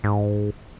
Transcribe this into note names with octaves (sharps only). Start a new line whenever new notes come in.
G#2